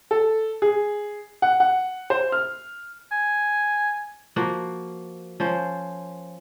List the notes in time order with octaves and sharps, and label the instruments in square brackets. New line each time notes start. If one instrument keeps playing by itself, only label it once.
[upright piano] A4
G#4
F#5
F#5
C5
F6
[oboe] G#5
[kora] F3 A#3 F#4
F3 C#4 C5